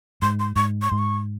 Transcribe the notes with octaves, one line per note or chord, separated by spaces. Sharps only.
G#2 C6
C6
G#2 C#6
C#6
G#2 C6
C#6